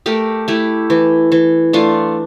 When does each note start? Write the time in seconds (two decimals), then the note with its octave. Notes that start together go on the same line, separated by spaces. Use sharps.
0.06 A3 G4 A#4
0.48 A3 E4 G4
0.90 E3
1.32 E3
1.73 A3 D4 F4